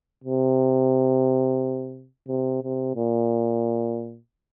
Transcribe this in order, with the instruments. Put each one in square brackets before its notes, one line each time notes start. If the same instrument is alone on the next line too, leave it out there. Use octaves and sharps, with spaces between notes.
[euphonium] C3
C3
C3
A#2